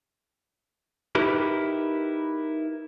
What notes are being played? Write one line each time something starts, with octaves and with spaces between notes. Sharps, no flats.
D#4 E4 G4 A#4 B4